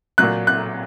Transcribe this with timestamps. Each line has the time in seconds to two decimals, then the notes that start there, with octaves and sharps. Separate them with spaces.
0.18 A#2 F#3 F#6
0.47 F#6